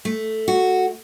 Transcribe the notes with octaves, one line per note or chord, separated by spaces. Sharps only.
A3
F#4